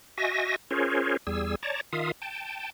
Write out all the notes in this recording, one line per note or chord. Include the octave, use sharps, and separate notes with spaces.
F#4 D#5 E5 G#5 A#6
C#4 F4 G#4 A#4 C5 C#5
E2 G3 G#4 E6
C#5 D5 A5 A#5
D#3 F4 E5 F5 D#6
G5 A5